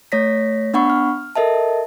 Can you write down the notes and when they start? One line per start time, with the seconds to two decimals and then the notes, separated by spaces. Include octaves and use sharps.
0.12 A3 C#5 A#6 B6
0.74 B3 D4 F#5 B5 C#6
0.90 F6
1.36 A4 A#4 D#5 E5 A5